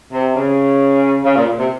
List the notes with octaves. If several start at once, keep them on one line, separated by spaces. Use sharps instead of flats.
C3
C#3
C#3
A#2
C3